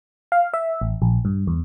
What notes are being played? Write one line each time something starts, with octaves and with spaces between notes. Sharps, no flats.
F5
E5
A1
A#1
G2
E2